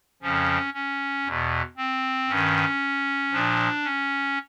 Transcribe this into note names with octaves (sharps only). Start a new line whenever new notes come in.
F2 C#3 F3 C#4
C#4
E2 B2
C4
G2 D#3 C#4
A#2 F3 D4
C#4